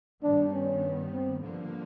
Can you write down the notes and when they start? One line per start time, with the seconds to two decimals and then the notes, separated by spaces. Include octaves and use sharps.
0.22 G2 D#3 G3 B3 D4
0.53 C#4
1.12 C4
1.42 G2 D3 F3 A#3